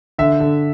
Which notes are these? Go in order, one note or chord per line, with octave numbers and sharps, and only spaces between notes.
D3 E5
D3